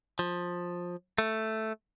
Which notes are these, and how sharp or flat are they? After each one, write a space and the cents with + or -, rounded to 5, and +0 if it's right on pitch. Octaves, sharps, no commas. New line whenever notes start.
F3 +15
A3 +0